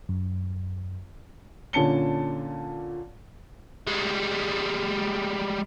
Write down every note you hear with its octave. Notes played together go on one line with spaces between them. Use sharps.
F#2
A#2 D3 C#4 A5 C#7 G7
G3 G#3